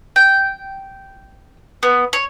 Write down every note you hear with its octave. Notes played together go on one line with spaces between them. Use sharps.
G5
B3
C#5